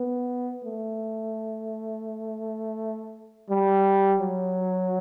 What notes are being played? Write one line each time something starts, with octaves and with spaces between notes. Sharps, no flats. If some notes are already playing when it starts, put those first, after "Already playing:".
Already playing: B3
A3
G3
F#3